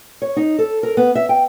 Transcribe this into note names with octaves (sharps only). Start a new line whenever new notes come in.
C#5
D#4
A4
A#4
B3
E5
G5